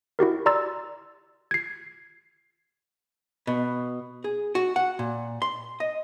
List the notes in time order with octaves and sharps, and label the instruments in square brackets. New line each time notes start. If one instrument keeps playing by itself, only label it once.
[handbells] E4 F#4 G4 A#4
D5 A#5 C6 E6 A6
G#6 C7
[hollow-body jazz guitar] B2
G#4
F#4
F#5
A#2
C6
D#5